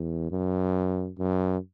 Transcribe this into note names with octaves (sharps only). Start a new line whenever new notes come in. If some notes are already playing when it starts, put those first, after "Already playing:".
Already playing: E2
F#2
F#2